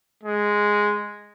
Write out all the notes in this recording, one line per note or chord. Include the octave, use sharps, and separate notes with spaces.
G#3